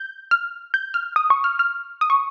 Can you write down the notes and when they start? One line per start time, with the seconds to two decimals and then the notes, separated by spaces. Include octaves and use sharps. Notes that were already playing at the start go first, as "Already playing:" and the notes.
Already playing: G6
0.31 F6
0.74 G6
0.94 F6
1.16 D#6
1.30 C#6
1.44 F6
1.59 F6
2.01 D#6
2.10 C#6